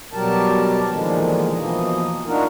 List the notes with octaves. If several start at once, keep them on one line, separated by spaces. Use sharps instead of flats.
B2 F#3 G3 G4 A#4 A5
E2 A#2 D3 D#3 F3 G#3
B2 E3 F3 A#3 D#5
D4 D#4 F4 F#4 A#4